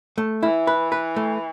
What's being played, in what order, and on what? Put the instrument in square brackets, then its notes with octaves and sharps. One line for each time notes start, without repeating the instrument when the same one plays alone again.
[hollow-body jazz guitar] A3
[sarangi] E3 [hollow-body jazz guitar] E4
[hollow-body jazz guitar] B4
B4
A3